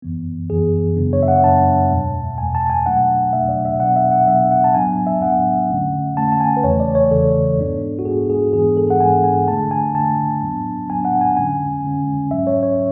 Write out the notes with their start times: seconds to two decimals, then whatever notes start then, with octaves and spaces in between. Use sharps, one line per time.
0.02 F#2 E3 B3
0.50 F#2 E3 B3 G#4
0.96 F#2 C#3 F#3 B3 D4
1.13 C#5
1.23 E5
1.28 F#5
1.44 F#2 C#3 F#3 B3 D4 A5
1.91 E2 B2 G#3
2.38 E2 B2 G#3 G#5
2.55 A5
2.70 G#5
2.86 B2 F#3 A3 D4 F#5
3.33 B2 F#3 A3 D4 E5
3.49 D5
3.65 E5
3.80 B2 F#3 B3 D4 F#5
3.96 E5
4.12 F#5
4.27 B2 F#3 B3 D4 E5
4.51 F#5
4.64 A5
4.74 A2 F#3 B3 D4 G#5
5.07 E5
5.22 A2 F#3 B3 D4 F#5
5.70 D3 A3 C#4
6.16 D3 A3 C#4 A5
6.32 A5
6.40 G#5
6.57 B4
6.63 E2 C#3 E3 A3 C#5
6.80 D5
6.95 C#5
7.11 E2 C#3 E3 A3 A4
7.58 G#2 G#3 B3 D4
7.99 F#4
8.05 G#2 G#3 B3 D4 G#4
8.30 G#4
8.53 G#2 E3 G#3 B3 D4 G#4
8.77 A4
8.90 F#5
9.00 G#2 E3 G#3 B3 D4 G#5
9.24 G#5
9.48 D3 A3 D4 A5
9.71 G#5
9.95 D3 A3 D4 A5
10.42 A2 F#3 B3 D4
10.89 A2 F#3 B3 D4 G#5
11.05 F#5
11.21 G#5
11.37 D3 G#3 C#4 G#5
11.84 D3 G#3 C#4
12.31 G#2 F#3 C#4 E5
12.47 C#5
12.63 C#5